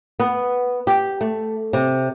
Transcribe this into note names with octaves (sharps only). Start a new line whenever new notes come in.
B3
G4
A3
C3